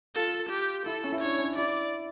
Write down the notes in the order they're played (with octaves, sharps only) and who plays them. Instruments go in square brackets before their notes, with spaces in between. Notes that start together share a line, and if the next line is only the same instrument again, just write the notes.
[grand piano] F4 [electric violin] A4
[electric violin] G4
[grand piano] E4 [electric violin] A4
[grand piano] C#4
E4
[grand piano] D4 [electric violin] C#5
[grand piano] C#4
[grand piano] E4 [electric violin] D5